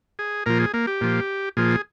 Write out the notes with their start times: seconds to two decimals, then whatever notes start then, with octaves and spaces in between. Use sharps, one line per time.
0.19 G#4
0.46 A#2 F3 A#4
0.60 G#4
0.74 A#3
0.87 G4
1.01 A#2 F3
1.57 A#2 F3 G#4